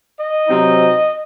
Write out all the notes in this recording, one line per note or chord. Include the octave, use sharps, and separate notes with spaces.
D#5
C3 F#3 C4 D#4